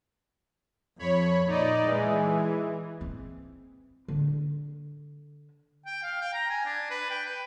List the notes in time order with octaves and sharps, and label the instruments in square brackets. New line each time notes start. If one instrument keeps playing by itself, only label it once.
[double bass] F2 [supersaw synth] C#5 B5
[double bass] A#2 [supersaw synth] D#4 D5 D#5
[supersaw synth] E3 [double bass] G#3
[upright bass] C4
D3
[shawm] G5
F5
G5
A#5
G#5
D4
B4
G5
B4